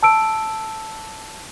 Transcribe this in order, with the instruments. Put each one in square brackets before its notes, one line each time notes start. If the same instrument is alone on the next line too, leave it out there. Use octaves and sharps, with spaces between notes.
[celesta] A5 E6 D7